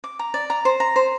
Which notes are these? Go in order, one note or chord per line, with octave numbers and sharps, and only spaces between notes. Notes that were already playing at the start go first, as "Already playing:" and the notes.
D6
A#5
D5
A#5
C5
A#5
C5